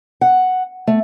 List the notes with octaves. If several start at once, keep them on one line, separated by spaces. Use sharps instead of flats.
F#5
A3